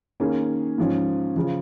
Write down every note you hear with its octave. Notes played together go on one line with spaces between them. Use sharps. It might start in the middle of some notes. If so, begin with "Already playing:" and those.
D#3 A#3 C#4 G#4
G#2 F3 C#4
C#3 F3